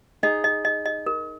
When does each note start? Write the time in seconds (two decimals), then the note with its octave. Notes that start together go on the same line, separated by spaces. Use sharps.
0.23 D#4 G#4 D#5
0.44 D#5
0.65 D#5
0.86 D#5
1.06 A#4